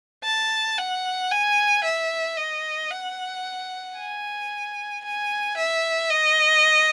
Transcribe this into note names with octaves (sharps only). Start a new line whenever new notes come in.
A5
F#5
G#5
E5
D#5
F#5
G#5
G#5
E5
D#5